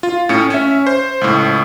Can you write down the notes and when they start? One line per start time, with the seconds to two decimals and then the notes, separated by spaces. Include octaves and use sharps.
0.03 F4
0.29 A2 C#4 C#7
0.50 C#4 E5
0.87 C5
1.21 C#2 A2